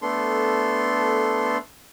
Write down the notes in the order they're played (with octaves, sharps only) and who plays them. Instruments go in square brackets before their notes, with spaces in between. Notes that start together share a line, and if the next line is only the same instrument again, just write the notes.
[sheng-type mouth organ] A3 B3 D4 A4 C6